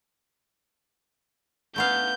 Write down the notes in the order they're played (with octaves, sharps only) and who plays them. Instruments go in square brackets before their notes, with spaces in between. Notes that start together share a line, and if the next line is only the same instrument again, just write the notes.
[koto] A3 B3 F5 [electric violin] G6